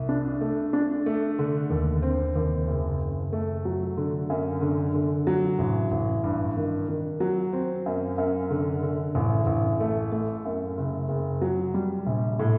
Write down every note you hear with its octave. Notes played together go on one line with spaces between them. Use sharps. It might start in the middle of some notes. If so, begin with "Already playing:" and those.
Already playing: C2
D4
A3
D4
A3
D3
D#2
C4
D#2
F#1
F#1
A3
F#3
D3
F#2
D3
D3
F#3
A1
A1
G2
D#3
D#3
F#3
C4
F#2
F#2
D3
D3
A1
A1
A3
A3
F#2
F#1
F#1
F#3
G3
A#1
A2